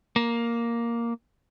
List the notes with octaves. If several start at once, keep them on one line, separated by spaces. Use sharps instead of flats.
A#3